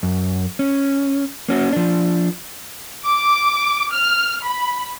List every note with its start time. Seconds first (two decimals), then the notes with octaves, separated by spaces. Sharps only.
0.03 F#2
0.59 C#4
1.49 A#3 C#4 F#4
1.73 F3 D4
3.05 D6
3.93 F6
4.45 B5